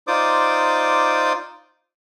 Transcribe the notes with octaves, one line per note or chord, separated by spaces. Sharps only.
D#4 F4 C5 D5 D6 D#6